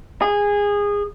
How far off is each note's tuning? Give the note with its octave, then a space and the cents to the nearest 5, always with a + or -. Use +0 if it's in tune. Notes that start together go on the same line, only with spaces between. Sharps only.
G#4 -20